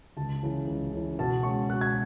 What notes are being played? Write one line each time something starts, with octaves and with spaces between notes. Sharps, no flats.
C#2 A5
C#3 E3
C#2
C#3 E3
B2 A5
G#3 C#4 C#6
B2 F#6
G#6